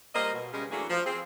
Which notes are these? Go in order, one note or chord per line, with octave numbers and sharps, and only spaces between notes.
G3 A#3 C5 D#5
B2
C#3 G3 G#3
E3 F#3 A3 A#3 D4 G#4
F3
C4 G#4